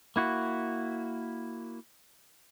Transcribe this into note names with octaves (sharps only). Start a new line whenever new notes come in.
A#3 E4 F#4